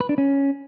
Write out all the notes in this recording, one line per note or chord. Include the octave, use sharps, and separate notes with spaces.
B4
D4
C#4